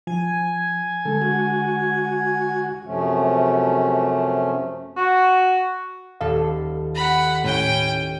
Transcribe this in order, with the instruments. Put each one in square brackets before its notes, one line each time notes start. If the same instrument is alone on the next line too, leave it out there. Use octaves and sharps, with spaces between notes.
[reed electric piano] F3 [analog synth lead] G#5
[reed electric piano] D3 G#3 [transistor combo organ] A4
[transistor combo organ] F#4
[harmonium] F#2 C3 F3 A3 C#4
[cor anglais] F#4
[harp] D#1 A4 [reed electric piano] F5
[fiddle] F#5 B5
[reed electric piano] A2 [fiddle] C#4 G5